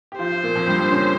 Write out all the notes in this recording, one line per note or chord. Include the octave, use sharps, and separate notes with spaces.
G4
F3 F4 C5
F3 F4
A#2 A#3
F2 F3
G2 G3
F2 F3
C#3 C#4